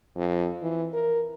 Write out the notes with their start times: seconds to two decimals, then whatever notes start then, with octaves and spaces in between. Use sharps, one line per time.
0.16 F2
0.62 E3
0.93 A#4